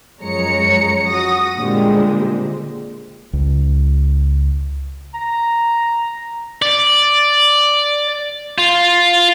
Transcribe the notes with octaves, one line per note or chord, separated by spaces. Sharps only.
F#2 F3 G#3 C#5 A#5 C#7
F#4 D#6 A#6
A#2 D3 G3 G#3 C4
C#2
A#5
D5
F4